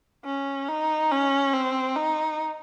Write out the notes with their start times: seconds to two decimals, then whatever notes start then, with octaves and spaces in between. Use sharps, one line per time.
0.25 C#4
0.68 D#4
1.11 C#4
1.54 C4
1.96 D#4